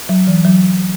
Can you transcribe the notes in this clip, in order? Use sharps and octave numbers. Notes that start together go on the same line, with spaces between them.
F#3
E3
F#3